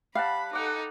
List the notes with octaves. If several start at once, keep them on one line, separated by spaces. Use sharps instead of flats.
G3 F5 F#5 A5 B5
D#4 A4 F#5 D6